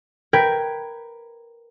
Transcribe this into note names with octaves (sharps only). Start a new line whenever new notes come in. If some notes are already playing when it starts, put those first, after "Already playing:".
A#4 B4 G5 G#6